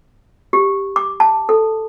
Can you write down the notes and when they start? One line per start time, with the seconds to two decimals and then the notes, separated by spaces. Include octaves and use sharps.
0.53 G4
0.96 D6
1.20 A5
1.49 A4